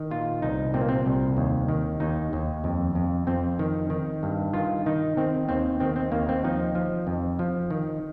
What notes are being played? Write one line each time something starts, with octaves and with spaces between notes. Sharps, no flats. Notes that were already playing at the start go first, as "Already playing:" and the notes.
Already playing: D#3
A#2 F4
C2 D#4
A#2 C4
A#3
C4
C2
D#2
D#3
D#2 D#4
D#2
F2
F2
F2 C4
D#3
D#3
G2
D#3 F4
D#3 D#4
D#3 C4
D#2 C4
D#3 C4
C4
D#2 A#3
C4
F3 D#4
F3
F2
F3
D#3